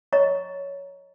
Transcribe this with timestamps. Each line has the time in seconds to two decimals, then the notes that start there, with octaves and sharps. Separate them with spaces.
0.13 C#5 D#5 A#5 C#6